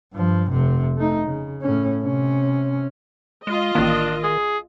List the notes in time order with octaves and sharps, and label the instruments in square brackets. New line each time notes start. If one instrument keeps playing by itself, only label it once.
[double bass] G2 F3
F1 C3
A3 D#4
C#3
A2 C#4
C3 C#4
[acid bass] G#3 [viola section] F4 D#5
[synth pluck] A1 A#3 [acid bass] D#3 [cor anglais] D4
[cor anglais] G#4